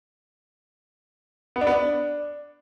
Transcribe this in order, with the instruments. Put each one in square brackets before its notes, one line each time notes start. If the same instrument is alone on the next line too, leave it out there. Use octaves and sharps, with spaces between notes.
[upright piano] B3
D4
B3
D4